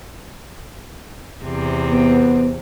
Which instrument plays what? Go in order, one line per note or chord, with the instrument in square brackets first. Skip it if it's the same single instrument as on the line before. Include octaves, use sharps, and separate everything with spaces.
[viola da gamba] E2 C3 C4
[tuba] B3